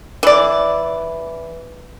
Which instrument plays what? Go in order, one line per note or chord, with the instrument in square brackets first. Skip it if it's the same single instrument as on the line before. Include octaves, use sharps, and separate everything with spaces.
[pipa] E3 D5